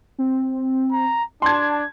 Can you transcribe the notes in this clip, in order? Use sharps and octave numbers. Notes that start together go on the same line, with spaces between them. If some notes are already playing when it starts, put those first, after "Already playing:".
C4
A#5
D4 A5 C6 G#6